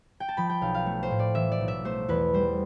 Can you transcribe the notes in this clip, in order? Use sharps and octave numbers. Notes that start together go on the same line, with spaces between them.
G5
A5
F3 B5
G5
B1 F5
F5
A3
C5
A2
D5
E3 E5
D5
B1
E5
A3 C5
E2 B4
G3 C5